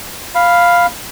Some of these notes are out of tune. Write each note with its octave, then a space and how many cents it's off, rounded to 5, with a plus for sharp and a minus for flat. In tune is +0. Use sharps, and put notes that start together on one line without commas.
F5 +0 B5 +0